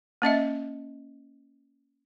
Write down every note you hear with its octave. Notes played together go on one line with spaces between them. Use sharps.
A#3 C#4 D#5 E5